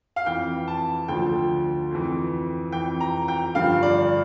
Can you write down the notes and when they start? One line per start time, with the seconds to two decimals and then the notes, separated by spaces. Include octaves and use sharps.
0.16 F5
0.26 F2 E3 G5
0.68 A5
1.08 D2 D3 F3 G5
1.91 F2 E3
2.72 F2 E3 G5
3.01 A#5
3.28 G5
3.55 G2 D3 F3 F5
3.83 D5